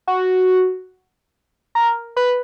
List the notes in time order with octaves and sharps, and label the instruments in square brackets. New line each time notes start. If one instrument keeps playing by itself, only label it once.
[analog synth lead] F#4
A#4
B4